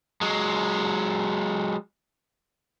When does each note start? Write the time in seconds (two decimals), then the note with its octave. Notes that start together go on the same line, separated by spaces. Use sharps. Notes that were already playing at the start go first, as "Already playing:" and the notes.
0.21 F#3 G#3